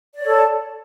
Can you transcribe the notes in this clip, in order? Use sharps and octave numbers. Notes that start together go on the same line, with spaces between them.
A4 C#5 D5 A5